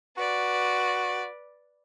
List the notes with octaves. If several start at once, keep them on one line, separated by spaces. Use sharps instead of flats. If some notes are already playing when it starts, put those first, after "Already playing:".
F#4 B4 D5